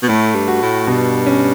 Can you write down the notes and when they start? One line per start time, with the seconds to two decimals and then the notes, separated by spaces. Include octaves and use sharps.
0.03 B2
0.08 A2 A3
0.35 G2
0.48 F#4
0.62 A2
0.87 G2 B2
1.26 C#4